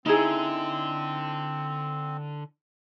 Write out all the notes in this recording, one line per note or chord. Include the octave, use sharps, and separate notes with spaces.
D3 C4 D#4 E4 G#4